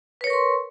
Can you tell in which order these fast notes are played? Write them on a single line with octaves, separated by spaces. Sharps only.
B4 C#5 A#4 C#6 C6